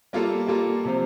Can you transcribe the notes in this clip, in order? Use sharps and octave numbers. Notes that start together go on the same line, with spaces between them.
G3 A#3 F4 A4
G3 A#3 F4 A4
C3 F3